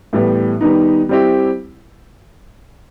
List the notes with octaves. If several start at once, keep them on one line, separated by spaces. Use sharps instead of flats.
A2 E3 G3 B3
D#3 G3 B3 D#4
G3 C4 E4 G4